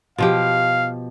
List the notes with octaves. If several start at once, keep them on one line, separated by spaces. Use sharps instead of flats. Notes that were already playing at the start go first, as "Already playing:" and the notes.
B2 F3 G4 F5